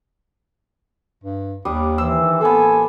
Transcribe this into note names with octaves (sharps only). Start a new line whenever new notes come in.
G2
D#2 G3 D4 D#6
D#3 E3 C5 E6
A1 A#3 B3 A4 C5 G#5